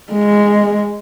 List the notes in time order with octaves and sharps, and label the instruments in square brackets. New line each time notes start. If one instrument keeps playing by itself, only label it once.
[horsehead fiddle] G#3